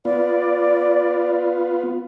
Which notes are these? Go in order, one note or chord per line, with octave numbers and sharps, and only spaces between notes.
B3 F4 D5